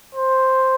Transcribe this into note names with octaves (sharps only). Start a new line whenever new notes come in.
C5